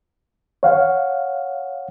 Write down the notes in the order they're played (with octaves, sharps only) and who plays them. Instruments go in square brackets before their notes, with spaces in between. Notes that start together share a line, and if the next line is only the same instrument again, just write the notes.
[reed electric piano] C#5 F5 F#5